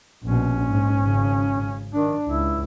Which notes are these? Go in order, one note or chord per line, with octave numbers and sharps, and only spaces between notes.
A#1 B2 C#4
G#2
G#1 C#3
D#3 D4
C#2 E4